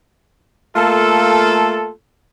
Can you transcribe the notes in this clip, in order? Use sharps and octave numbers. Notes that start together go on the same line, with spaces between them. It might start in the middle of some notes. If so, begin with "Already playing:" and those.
A3 A#3 F4 A4